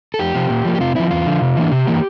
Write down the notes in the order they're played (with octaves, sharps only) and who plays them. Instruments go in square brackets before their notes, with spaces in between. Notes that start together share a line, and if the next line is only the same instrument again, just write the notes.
[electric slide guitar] A4
F2 G4
C3 F3 C4
A#2
F3 A#3
G4
C3 F4
F3 C4 E4
E2 F4
D3 F3
C3
E3 A#3 D4
F4
C3 G4
E3 A#3